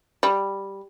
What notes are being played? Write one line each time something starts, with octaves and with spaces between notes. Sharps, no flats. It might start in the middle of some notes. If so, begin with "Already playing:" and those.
G3